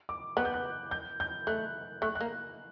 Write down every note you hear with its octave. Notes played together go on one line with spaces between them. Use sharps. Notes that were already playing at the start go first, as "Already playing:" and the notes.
D6
B3 F#6
G6
F#6
G6
G6
A3 F#6
A3 F#6
F#6
A#3